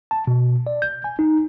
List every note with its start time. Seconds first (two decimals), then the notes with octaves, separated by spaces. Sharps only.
0.11 A5
0.27 B2
0.67 D5
0.82 G6
1.04 G#5
1.19 D#4